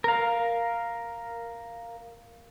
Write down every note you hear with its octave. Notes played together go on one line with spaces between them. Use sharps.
A#4 F5